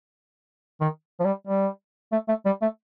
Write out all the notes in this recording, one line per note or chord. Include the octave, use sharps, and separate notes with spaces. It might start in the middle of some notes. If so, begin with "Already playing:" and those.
D#3
F3
G3
G3
A3
A3
G3
A3